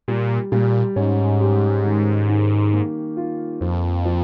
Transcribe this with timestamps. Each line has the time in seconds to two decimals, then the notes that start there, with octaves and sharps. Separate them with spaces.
0.08 A#2 G3
0.52 A#2 G3
0.96 G#2 C#4
1.41 G4
1.85 D#3
2.29 D#3
2.73 A#3
3.17 F4
3.61 F2 F3
4.05 F3